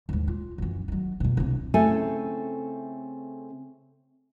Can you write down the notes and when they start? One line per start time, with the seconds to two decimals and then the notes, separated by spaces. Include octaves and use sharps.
0.09 D#2 G#2
0.28 F4
0.58 F#2 E3
0.88 D#3 F#3
1.20 F2 B2
1.37 C2 D3
1.74 C#3 A3 C4 E4 A4 G#5